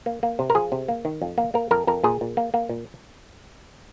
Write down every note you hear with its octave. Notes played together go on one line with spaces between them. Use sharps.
A#3
A#3
C3
A#4
F3 G#4
C3
A#3
D#3
F2
A#3
A#3 A#4
F2 A#4
F2 A#4
A#2 G#4
A#2
A#3
A#3
A#2